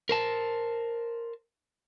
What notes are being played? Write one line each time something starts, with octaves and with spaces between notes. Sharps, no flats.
A#4 C5 A5